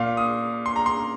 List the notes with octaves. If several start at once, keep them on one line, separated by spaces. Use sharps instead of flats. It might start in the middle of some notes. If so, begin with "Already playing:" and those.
Already playing: A#2 F5
D#6
C6
A#5
C6